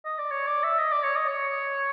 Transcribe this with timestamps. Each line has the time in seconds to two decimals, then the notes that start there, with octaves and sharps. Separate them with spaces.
0.05 D#5
0.18 D5
0.31 C#5
0.47 D5
0.63 E5
0.79 D#5
0.91 D5
1.04 C#5
1.16 D#5
1.28 C#5